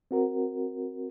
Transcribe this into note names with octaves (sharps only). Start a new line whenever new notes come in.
C4 F#4 A#4